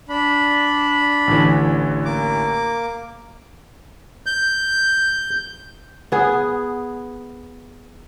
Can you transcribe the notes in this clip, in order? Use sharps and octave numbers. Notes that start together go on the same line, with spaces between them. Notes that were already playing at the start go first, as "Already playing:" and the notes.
D4 B5
A1 D3 E3
A#3 D6
G6
B3 G#4